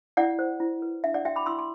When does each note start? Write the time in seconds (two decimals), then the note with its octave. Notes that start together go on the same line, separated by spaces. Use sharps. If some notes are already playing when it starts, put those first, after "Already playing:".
0.17 E4 D5 F#5
0.39 C5
0.60 E4
0.82 B4
1.04 D4 E5
1.14 D5 F#5
1.25 F#4 E5 G5
1.36 B5 D6
1.46 E4 C6 E6
1.59 C6